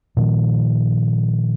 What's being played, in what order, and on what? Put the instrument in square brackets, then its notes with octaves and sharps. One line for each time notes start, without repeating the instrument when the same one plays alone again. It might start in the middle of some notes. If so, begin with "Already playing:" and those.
[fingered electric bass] A#2 D#3 F3